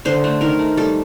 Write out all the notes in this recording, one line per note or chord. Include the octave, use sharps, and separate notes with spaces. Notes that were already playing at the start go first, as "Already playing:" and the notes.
D3 C5
A3
D#3 A#4
A3
G3 A4